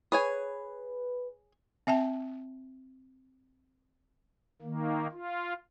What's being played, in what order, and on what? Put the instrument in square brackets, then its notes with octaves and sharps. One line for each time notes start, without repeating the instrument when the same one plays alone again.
[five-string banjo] G#4 C#5 G#5 [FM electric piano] B4
[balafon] C4 E5 G5 A5
[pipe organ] D#3 A#3
F4